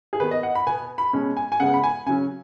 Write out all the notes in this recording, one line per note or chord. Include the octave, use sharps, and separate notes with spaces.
G#4
D#3 B3 B4
D#5
F#5
B5
B2 B3 G#5
B5
B2 G#3 C#4
G#5
G#5
C#3 G#3 B3 F#5
B5
G#5
C#3 F#3 C#4 G#5